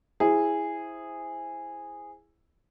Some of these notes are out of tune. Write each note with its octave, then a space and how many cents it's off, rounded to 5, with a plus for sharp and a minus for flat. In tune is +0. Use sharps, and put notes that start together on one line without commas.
E4 +0 G#4 -10 C5 +0